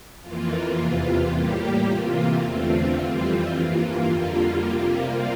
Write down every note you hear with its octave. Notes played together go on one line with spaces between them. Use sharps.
F2 E3 A#3 F4
E2 C3 E3 F4
A2 G3 A#3 G4
C3 E3 A#3 F4
E2 D3 A3 C4 F4
F2 E3 G3 C4 F4
G2 E3 A#3
F2 D3 G3 A#3 F4
C3 G3 A#3